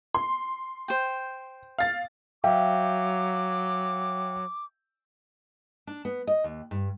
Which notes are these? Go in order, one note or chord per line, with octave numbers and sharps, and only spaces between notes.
C6
C5 G5
F5 A6
F#3 E5 F5 G5 D6
D4
B3
D#5
D#2
G2